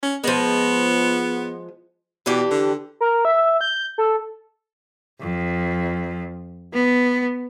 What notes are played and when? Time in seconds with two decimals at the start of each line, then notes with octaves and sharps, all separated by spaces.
0.03 C#4
0.24 F3 G#3 B3
2.26 B2 E3 D4 G4
2.51 D3
3.01 A#4
3.25 E5
3.61 G6
3.98 A4
5.20 F2
6.74 B3